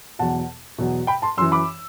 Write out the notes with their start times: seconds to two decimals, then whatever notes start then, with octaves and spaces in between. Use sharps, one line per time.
0.19 E2 B2 F#3 F#5 A5
0.78 E2 B2 F#3
1.07 G5 B5
1.22 A5 C6
1.37 F#2 C6 E6
1.41 E3
1.52 B5 D6